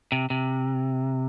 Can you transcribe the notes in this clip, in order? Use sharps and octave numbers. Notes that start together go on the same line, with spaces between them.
C3
C3